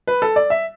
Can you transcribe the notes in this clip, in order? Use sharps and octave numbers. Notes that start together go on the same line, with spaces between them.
B4
A4
D5
E5